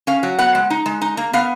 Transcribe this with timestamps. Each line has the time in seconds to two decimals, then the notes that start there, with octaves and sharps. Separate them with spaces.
0.07 C#4 F5
0.23 F#3
0.39 B3 F#5
0.55 G#3
0.70 D#4
0.86 G#3
1.02 D#4
1.17 A#3
1.33 B3 F5